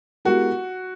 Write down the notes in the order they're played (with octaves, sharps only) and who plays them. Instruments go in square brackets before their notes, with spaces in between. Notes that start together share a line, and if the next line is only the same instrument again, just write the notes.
[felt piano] G#3 B3 E4 G4 A#4 [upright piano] F#4